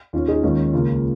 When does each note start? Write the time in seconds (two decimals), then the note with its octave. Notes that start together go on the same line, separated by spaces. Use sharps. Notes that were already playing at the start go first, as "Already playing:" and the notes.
0.13 D#2 D#3 C#4 F4
0.28 D#4 G#4
0.43 D#2 D#3 G#3 C#4 F4
0.73 C#2 C#3 A#3 C#4 F4